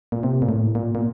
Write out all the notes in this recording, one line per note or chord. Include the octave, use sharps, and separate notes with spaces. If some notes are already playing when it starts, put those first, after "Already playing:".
A#2
C3
A#2
A2
A#2
A#2